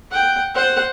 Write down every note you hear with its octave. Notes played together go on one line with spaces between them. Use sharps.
F#5 G5
C5 F#5